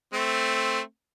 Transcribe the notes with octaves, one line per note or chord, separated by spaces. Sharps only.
A3 C4